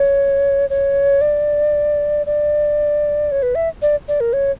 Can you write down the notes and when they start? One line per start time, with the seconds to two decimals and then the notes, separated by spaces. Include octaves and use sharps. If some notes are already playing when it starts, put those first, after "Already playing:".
Already playing: C#5
0.70 C#5
1.21 D5
2.26 D5
3.32 C#5
3.43 B4
3.55 E5
3.82 D5
4.08 D5
4.20 A#4
4.33 C#5